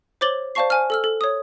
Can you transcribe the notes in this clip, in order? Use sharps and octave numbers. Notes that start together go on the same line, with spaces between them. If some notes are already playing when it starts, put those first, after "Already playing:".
C5 C#5 D6 A6 F#7 G7
C5 D5 F5 A5 C#6 C7
C5 G#5 F6
A4 E6 F6
A4
C#5 D#6